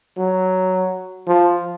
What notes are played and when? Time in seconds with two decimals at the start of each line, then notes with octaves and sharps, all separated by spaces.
0.17 F#3
1.27 F3